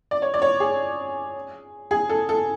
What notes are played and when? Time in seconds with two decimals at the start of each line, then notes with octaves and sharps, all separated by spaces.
0.11 D5
0.22 C#5
0.34 D5
0.42 C#5
0.60 G#4
1.91 G#4
2.09 A4
2.29 A4